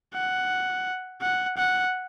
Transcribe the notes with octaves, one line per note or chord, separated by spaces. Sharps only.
F#5
F#5
F#5